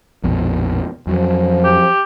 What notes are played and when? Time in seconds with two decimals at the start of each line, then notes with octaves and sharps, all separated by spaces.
0.24 A#1 F2 B2
1.07 F2 F3 F#3
1.64 G4